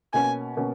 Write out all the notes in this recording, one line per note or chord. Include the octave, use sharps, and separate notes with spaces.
B2 A#3 C#4 G#5
B2 A#3 C#4